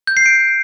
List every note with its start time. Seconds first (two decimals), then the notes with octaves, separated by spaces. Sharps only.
0.07 G6
0.17 C7
0.26 D7